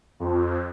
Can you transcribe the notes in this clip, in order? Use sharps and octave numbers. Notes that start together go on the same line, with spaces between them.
F2